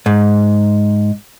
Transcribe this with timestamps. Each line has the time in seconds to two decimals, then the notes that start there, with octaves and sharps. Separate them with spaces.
0.06 G#2